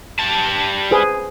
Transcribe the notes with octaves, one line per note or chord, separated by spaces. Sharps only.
G3 A5
G#4 B4 C5